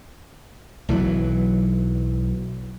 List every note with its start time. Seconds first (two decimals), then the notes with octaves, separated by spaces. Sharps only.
0.88 B1 E3 F#3